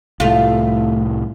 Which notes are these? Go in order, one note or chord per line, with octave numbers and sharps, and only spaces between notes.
C2 A2 A3 F4